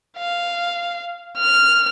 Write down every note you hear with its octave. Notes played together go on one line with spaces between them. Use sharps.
F5
F6